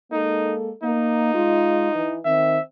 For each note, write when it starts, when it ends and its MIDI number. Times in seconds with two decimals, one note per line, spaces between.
0.12 0.70 56
0.12 0.70 58
0.12 0.55 63
0.12 0.70 69
0.83 1.31 58
0.83 2.17 63
1.35 1.92 56
1.35 1.92 65
1.94 2.18 52
2.25 2.58 51
2.25 2.58 60
2.25 2.60 76